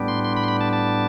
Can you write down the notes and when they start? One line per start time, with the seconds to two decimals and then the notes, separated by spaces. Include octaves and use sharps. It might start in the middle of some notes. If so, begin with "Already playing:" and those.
Already playing: A2 G3 B3 D4
0.08 C6
0.24 C6
0.36 B5
0.43 C6
0.48 B5
0.61 A5
0.73 A5